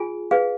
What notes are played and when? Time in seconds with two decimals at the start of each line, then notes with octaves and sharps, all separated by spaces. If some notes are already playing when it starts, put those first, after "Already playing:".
Already playing: F4 G#4 G#5
0.31 G#4 B4 F5